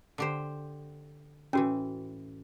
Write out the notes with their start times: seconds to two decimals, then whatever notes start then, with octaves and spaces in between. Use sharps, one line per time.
0.18 D3 G4 C5
1.53 A2 E3 C#4 F#4